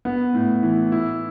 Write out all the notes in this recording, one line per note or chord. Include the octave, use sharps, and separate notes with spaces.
B3
A2
E3
E4